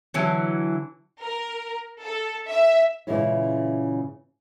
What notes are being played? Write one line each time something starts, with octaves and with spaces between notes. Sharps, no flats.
D3 E3 F#3
A#4
A4
E5
A#2 C#3 E3 G#3 C#4 E4